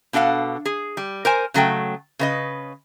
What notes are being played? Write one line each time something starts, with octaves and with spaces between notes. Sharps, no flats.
B2 D4 A4 F5 F#5
G#4
G3
A#4 C5 G#5
C#3 F#3 A3 G5
C#3 B4 D#5